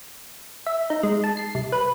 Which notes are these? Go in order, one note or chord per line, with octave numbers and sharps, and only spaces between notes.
E5
D#4
G#3
A5
C7
C2
B4